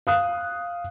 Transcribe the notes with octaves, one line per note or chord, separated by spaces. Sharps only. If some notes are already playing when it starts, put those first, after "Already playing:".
F5 D#6 F#6